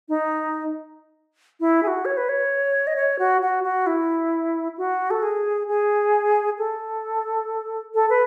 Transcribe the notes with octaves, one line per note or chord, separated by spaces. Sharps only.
D#4
E4
G#4
F#4
C#5
B4
C#5
D#5
C#5
F#4
F#4
F#4
E4
F#4
A4
G#4
G#4
A4
A4
B4